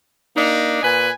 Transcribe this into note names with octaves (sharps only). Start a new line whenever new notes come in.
A#3 D4 D#4
A#2 B4 G#5